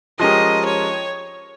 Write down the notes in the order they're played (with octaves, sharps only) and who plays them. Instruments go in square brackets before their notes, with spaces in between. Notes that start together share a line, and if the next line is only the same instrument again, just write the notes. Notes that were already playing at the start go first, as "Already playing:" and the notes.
[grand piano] F3 G#3 C#4 G4 A#4 [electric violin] D#5
[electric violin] C#5